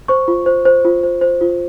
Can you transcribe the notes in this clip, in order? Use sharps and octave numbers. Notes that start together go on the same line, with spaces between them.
C5 C#6
F4
C5
C5
F4
C5
C5
F4